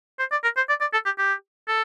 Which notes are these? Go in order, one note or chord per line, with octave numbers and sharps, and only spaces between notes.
C5
D5
A#4
C5
D5
D5
A4
G4
G4
A4